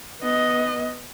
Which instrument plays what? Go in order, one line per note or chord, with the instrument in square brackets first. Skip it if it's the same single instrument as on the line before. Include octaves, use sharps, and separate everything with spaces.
[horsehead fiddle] B3 D#5